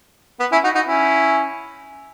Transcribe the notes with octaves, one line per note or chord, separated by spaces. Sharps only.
B3
C#4 E4
D#4 F#4
D#4 F#4
C#4 E4